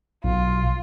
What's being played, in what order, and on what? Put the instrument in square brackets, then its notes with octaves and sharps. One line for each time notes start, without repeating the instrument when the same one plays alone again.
[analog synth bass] B1 [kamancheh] F4